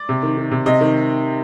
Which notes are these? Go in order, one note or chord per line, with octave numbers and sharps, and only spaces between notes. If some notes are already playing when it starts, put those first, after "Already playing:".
Already playing: D5
C3
D#3
D#3
C3
C3 D#5
D#3